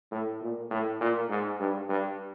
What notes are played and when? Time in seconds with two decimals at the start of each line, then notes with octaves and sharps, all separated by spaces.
0.12 A2
0.41 A#2
0.71 A2
1.01 A#2
1.30 G#2
1.60 G2
1.89 G2